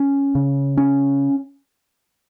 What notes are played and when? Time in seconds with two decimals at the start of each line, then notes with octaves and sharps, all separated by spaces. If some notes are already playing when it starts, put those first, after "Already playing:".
Already playing: C#4
0.35 C#3
0.77 C#4